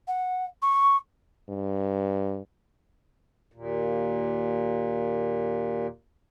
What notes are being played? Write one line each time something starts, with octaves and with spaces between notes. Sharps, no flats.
F#5
C#6
G2
D#2 A#2